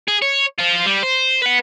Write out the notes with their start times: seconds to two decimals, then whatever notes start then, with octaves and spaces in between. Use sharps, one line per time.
0.08 G#4
0.22 C#5
0.58 F4 C5
0.86 G3
1.03 C5
1.42 B4 F#5